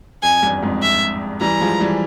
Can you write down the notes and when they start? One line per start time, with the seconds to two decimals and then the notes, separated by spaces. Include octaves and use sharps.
0.22 F2 G#5
0.43 E2 G2
0.62 F2 G#2
0.82 E5
1.41 E3 G3 A#5
1.60 F3 G#3
1.80 E3 G3